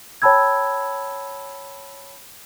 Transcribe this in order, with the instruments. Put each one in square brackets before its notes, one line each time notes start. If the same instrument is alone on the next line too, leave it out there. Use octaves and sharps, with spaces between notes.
[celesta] C#5 G5 A5 B5 E6 G#6